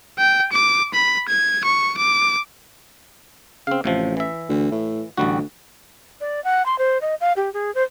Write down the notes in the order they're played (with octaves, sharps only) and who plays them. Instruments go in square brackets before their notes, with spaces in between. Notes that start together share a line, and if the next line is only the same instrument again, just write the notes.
[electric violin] G5
D6
B5
G#6
C#6
D6
[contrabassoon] C#3 [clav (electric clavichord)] C4 F5
[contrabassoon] A1 [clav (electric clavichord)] A2 C3 F3
[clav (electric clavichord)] E3 E5
[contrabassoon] D2
A2
[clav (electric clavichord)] A1 G3 F#4 [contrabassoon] D2
[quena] D5
F#5
C6
C5
D#5
F5
G4
G#4
C5